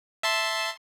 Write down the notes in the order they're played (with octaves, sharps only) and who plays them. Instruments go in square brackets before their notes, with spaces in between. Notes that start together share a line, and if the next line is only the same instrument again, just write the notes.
[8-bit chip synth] E5 A5 C6